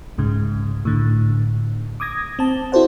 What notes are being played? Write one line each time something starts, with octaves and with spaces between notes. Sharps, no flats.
C2 G#2 C#3
A2 D3
D6 D#6 G#6 A#6
C4 A5
E4 F#4 A4 C5 D5 F#5